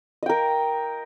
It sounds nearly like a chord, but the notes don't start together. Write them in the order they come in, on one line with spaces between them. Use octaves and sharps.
D#5 G5 A#4